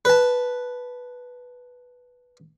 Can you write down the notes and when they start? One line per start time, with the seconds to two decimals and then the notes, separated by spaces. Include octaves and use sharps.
0.05 B4 A5